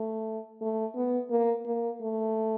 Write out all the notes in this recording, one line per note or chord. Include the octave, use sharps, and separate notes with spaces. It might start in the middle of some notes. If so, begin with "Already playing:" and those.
Already playing: A3
A3
B3
A#3
A#3
A3